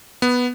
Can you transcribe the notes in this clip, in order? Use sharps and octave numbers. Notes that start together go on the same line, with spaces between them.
B3